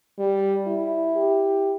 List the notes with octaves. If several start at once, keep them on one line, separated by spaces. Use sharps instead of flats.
G3
E4
G4